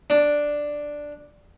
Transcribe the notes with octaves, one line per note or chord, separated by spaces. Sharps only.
D4